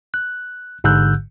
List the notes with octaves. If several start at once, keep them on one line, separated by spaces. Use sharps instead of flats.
F#6
A1 G#2 D3 E6 F#6 G6